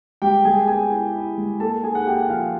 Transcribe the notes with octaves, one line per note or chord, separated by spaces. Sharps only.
G#3 G4 G5
G#3 G#4 G#5
B3 G#4 G#5
E4
E4
G#3
A#3 A4 A5
D#4 G#4 G#5
F#5
A#3 G4 G5
F#5
F3 F4 F5